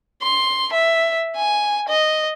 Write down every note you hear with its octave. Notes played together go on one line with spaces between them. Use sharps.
C6
E5
G#5
D#5